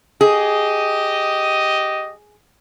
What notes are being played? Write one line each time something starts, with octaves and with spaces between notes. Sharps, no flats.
G4 G#4 D#5